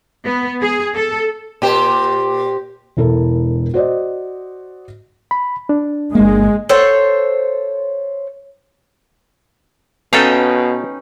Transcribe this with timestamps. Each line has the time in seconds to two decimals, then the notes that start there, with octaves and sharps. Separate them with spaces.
0.24 B3
0.61 G#4
0.95 A4
1.62 A#2 G4 C5
2.97 E1 E4 A4 A#4
3.74 F#4 C5 D5 D#5
5.31 B5
5.69 D4
6.15 G1 G#3 A#3
6.69 A4 C5 C#5 F#5
10.13 B2 C#4 D#4 A4 B4 F5 G5